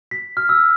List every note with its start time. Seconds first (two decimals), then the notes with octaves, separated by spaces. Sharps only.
0.11 B6
0.37 F6
0.49 E6